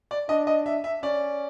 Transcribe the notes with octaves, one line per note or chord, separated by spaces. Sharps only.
D5
D4 D#5
D#5
E5
E5
C#4 D5